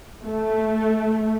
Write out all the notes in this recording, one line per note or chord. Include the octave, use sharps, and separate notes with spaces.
A3